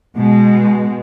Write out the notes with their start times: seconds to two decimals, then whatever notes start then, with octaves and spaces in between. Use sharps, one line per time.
0.17 B2 G#3